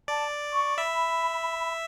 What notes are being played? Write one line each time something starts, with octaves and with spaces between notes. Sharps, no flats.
D5 A5
C#6
E5 B5